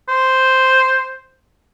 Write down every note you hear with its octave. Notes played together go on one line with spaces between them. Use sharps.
C5